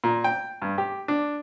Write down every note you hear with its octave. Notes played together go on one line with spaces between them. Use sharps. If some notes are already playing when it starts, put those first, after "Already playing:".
A#2
G5
G2
G4
D4